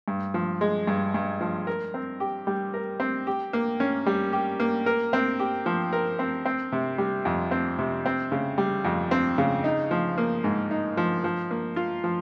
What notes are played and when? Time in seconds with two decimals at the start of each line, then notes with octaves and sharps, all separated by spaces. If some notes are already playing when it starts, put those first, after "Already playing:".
0.08 G2
0.34 F3
0.61 G#3
0.87 G2
1.14 G2
1.41 F3
1.67 A#4
1.94 C4
2.20 G4
2.47 G3
2.74 A#4
3.00 C4
3.27 G4
3.53 A#3
3.80 C#4
4.06 G3
4.33 G4
4.60 A#3
4.86 A#4
5.13 C4
5.40 G4
5.66 F3
5.93 A#4
6.19 C4
6.45 C4
6.72 C3
6.98 G3
7.25 F2
7.51 C4
7.78 C3
8.06 C4
8.32 C#3
8.58 G3
8.85 F2
9.11 C4
9.38 C#3
9.64 D#4
9.91 F3
10.18 A#3
10.44 G#2
10.71 D#4
10.97 F3
11.24 F3
11.51 A#3
11.76 F4
12.04 F3